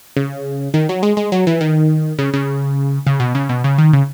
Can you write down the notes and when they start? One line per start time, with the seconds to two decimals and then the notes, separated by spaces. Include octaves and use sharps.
0.17 C#3
0.74 D#3
0.89 F#3
1.03 G#3
1.17 G#3
1.32 F#3
1.47 E3
1.61 D#3
2.19 C#3
2.34 C#3
3.07 C#3
3.20 B2
3.35 C#3
3.49 B2
3.64 C#3
3.78 D#3
3.93 C#3